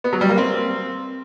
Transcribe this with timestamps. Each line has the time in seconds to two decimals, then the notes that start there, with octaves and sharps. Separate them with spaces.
0.04 B3
0.13 F#3
0.21 G3
0.29 A#3
0.38 C4